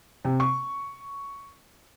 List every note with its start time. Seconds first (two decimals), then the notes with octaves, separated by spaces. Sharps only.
0.25 C3
0.40 C#6